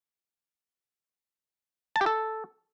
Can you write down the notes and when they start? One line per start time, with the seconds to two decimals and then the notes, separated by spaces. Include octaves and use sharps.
1.96 A5
2.01 G4
2.06 A4